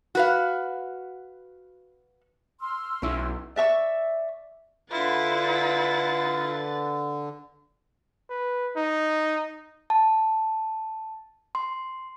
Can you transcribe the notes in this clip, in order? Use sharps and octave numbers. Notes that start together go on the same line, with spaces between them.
F#4 B4 F5
C6 E6 F6
B1 C#4 E4
D5 E5 C#6 E6
D3 E4 F4 B4 A6
B4
D#4
A5
C6